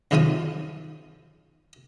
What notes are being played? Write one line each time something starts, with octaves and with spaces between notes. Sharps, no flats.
F#2 C3 D#3 F3 F4 D#6